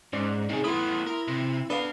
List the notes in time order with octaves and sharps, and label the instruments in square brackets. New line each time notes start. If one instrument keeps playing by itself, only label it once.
[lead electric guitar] G#2 [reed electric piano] C#4 C5 D5
[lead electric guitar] C3 C#4 [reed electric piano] D#4 G#4
[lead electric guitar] A3 B3 [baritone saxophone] E4 [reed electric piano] C6 D#6
[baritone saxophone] E4 [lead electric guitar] A#4
[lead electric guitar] C3
[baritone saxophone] B3 [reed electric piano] D4 [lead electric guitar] A4 F5